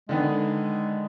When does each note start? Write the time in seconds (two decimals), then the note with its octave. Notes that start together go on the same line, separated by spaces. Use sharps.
0.09 D3 D#3 G#3 B3